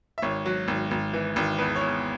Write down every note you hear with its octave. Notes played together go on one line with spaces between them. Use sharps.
E5
G#1 C#5
F#3
G#1
G#1
E3
G#1
E2 B4
C#5
E2